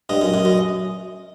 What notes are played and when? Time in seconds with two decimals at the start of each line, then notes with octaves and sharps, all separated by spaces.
0.09 G2 D#5
0.21 F#2
0.34 F#2
0.45 F#2